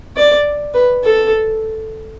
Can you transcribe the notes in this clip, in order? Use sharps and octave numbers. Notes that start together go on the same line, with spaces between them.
D5
B4
A4